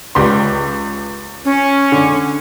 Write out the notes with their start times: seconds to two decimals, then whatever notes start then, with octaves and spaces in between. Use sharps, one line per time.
0.15 C#2 G4 C6
1.45 C#4
1.92 D3